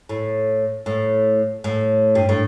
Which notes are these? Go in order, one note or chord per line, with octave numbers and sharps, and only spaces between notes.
A2
A2
A2
G2
A2